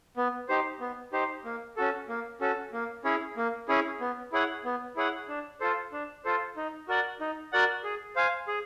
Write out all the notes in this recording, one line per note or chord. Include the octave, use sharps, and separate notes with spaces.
B3
D#4 G4 C5
B3
D#4 G4 C5
A#3
C#4 F#4 A4
A#3
C#4 F#4 A4
A#3
C#4 E4 G#4 C#5
A#3
C#4 E4 G#4 C#5
B3
E4 G#4 C#5 F#5
B3
E4 G#4 C#5 F#5
D4
F4 A4 C5
D4
F4 A4 C5
D#4
F#4 A#4 D5 F#5
D#4
F#4 A#4 D5 F#5
G#4
C5 F5 G#5
G#4